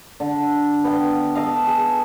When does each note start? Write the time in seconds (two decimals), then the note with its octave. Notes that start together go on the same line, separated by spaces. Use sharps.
0.20 D3
0.84 B3 D5 F5 G5
1.35 A4 D#5 F5
1.67 G#4